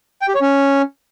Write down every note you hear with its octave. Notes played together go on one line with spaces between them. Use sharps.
G5
G4
C#5
C#4